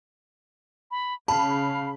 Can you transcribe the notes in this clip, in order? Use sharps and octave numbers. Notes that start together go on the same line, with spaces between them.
B5
C#3 F5 A5 B5